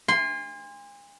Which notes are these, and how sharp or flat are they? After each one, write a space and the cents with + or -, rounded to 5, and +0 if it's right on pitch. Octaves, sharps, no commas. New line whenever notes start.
G#5 -40 C6 +0